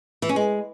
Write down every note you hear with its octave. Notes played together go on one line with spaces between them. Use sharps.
E3
C#4
G#3